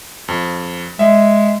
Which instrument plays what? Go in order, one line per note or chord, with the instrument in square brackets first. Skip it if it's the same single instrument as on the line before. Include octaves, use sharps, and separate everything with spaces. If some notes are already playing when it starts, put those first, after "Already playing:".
[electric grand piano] F2
[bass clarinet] G#3 [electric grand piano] E5